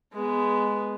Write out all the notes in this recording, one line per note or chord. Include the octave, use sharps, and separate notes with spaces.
G#3 B3